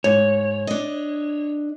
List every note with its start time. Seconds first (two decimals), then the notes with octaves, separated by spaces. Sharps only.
0.04 G#2 C#5
0.67 D4 D#5